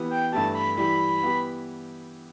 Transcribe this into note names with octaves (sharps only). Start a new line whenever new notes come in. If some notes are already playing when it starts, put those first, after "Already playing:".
Already playing: E3 B3 G4
G5
G2 E3 A3 E4 G4 A5
B5
E3 G3 E4 G4 B5
E3 B3 G4